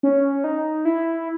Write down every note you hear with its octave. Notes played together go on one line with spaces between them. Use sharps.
C#4
D#4
E4